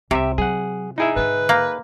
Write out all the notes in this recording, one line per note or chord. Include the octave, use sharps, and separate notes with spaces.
C2 C3 G4 E5
F#3 G#4 F#5
D#4 E4 G#4 E5
G#2 D3 B4
A#3